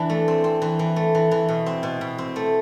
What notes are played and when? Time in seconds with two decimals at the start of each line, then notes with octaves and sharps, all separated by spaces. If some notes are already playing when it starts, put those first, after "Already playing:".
Already playing: E3 D4
0.10 A3
0.28 C4
0.44 C4
0.62 E3
0.79 E3
0.96 A3
1.15 E3
1.31 E3
1.49 B2
1.66 C4
1.83 B2
2.01 B2
2.18 C4
2.36 A3